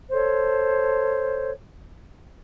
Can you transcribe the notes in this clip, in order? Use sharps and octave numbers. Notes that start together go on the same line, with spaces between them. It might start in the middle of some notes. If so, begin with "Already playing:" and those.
A4 C5 C#5